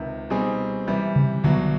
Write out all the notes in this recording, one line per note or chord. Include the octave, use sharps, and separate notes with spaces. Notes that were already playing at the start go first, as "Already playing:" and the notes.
Already playing: C#2 C3 D#3
B2 G3 C4 D#4 G#4
C3 E3 G3
C#3
C2 B2 D3 F#3